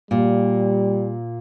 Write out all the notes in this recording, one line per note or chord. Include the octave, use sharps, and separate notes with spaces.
A#2 G3